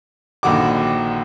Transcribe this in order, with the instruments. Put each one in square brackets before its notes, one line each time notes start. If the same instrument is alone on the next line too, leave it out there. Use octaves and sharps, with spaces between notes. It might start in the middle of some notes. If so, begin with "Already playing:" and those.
[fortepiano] A#1 D3 D#3 F#4 D6